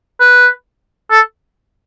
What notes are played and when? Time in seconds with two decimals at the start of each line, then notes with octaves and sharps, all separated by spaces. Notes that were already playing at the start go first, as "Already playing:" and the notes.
0.20 B4
1.11 A4